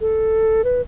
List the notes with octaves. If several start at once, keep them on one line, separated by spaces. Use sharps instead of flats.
A4
B4